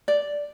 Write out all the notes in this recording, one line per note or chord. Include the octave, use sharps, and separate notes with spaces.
D5